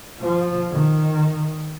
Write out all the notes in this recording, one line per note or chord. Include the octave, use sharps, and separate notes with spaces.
F3
D#3